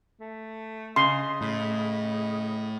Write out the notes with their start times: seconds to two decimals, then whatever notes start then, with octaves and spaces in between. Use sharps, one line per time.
0.20 A3
0.96 C#3 D#5 C6
1.41 A2 D#5